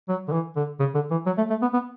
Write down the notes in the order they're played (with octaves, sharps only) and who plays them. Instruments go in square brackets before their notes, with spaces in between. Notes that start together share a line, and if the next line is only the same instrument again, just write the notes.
[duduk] F#3
D3
E3
D3
C#3
D3
E3
F#3
A3
A3
B3
B3